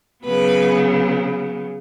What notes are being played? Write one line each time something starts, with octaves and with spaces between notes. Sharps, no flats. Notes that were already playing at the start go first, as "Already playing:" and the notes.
C#3 F#3 B3 B4